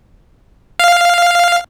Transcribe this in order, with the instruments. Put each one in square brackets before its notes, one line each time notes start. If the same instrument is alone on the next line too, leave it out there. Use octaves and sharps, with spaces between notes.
[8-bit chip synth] F5